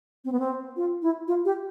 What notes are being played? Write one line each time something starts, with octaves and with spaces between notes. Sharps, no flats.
C4
B3
C4
F4
E4
F4
G4